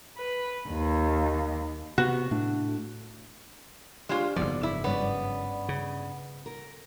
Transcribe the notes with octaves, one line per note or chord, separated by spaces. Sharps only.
B4
D#2
C3 B3 F#4
A2 A3 D4
G#3 D4 F4 G4 C5
F#1 G#2 F3 B3 D5
E4
G2 B3 C#4 D5
C#3
A#4